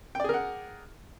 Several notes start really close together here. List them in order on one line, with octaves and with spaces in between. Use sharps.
G5 D5 G#4 A#4 F#5